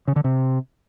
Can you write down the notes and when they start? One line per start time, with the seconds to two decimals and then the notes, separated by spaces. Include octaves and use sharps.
0.08 C#3
0.16 D3
0.24 C3